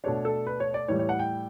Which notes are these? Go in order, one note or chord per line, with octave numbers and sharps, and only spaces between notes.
B2 A3 D4 C#5
A4
B4
C#5
D5
A2 E3 G3 C#5
C#5
F#5
G5